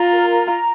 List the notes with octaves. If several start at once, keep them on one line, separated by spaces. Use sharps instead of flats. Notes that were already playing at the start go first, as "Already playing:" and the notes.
Already playing: F4 A#5
A#4
A#5
A#5